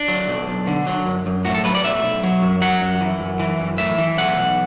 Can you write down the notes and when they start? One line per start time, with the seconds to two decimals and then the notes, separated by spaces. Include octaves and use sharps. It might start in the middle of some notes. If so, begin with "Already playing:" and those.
Already playing: D4
0.08 F#3
0.28 B1
0.48 B1
0.67 D3
0.87 F#3
1.06 F#2
1.26 F#2
1.45 A2 F#4
1.55 A4
1.65 F#3 B4
1.75 D5
1.84 B1 E5
2.04 B1
2.23 F#3
2.42 F#2
2.62 F#3 F#5
2.81 F#2
3.01 E3
3.20 F#2
3.40 E3
3.60 F#2
3.78 A2 E5
3.98 E3
4.17 B1 F#5
4.37 B1